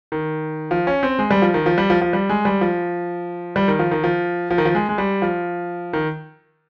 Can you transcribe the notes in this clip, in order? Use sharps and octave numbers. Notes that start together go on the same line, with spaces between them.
D#3
F3
C#4
C4
G#3
G3
F3
D#3
F3
G3
F3
F3
G3
G#3
G3
F3
G3
D#3
F3
D#3
F3
F3
D#3
F3
G#3
G#3
G3
F3
D#3